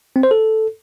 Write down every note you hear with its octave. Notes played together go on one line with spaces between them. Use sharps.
C4
C5
A4